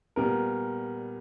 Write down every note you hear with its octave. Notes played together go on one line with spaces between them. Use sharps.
A#2 G3 B3 A#4